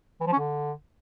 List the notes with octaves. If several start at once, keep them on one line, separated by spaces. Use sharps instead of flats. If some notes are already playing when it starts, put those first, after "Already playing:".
E3
F3
C#4
D3